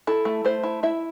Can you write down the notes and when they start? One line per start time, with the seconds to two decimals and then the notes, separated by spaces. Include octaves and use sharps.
0.07 E4 A4
0.25 A3
0.45 A3 C5
0.63 E4
0.83 E4 E5